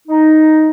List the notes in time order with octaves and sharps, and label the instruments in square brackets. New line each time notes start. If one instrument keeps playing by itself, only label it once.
[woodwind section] D#4